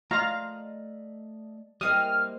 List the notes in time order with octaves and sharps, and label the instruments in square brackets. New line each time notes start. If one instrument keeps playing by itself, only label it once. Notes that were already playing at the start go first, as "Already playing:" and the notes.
[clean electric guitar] A3 D5 D#5 [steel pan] F4 F5 A#5
[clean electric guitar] G3 D#5 [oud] A#3 C4 E4 [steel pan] D#6 [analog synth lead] F6